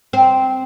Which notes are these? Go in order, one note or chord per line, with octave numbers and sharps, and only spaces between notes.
C4